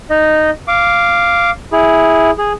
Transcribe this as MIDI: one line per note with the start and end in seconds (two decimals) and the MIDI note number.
0.10 0.50 63
0.10 0.50 75
0.68 1.50 77
0.68 1.50 86
1.72 2.31 64
1.72 2.31 68
2.38 2.52 68